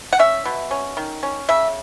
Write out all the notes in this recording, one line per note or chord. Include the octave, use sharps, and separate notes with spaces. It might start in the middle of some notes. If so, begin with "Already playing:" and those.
F#5
C#4 E5
B2
C#4
D#3
C#4
C#3 E5